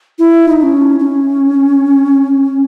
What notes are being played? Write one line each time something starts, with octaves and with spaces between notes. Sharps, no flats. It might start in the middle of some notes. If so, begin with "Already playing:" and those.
E4
D#4
D#4
C#4
C#4